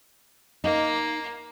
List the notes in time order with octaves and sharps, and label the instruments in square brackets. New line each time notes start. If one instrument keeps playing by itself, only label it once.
[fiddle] A#3 [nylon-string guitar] D#4